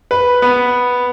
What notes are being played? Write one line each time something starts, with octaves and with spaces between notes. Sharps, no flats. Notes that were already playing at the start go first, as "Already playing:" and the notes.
B4
B3